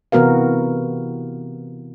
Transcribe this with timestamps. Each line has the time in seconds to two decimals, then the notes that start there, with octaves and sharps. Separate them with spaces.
0.12 C3 E3 B3 F#4 A#4 F5